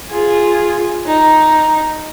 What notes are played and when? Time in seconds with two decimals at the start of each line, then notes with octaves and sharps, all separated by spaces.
0.11 F4 G#4
1.06 D#4